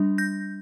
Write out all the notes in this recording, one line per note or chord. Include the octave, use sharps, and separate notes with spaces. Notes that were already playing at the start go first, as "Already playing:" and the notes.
Already playing: G3 D4
G6 A#6